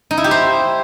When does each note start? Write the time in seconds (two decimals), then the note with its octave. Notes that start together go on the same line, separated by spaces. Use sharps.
0.11 D#4
0.17 E4
0.24 G4
0.31 C5